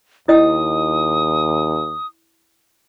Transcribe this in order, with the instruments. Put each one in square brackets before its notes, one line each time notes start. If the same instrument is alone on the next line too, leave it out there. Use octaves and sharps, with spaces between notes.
[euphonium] D#2 [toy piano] E4 D#5 G5 [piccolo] D#6